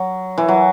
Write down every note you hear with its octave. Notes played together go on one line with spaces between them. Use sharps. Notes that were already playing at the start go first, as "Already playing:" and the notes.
Already playing: F#3
E3
F#3